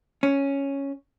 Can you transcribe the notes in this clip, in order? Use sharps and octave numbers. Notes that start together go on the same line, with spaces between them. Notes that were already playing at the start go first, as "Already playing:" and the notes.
C#4